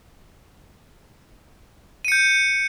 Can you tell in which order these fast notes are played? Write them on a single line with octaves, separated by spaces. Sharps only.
D#7 C#7 G6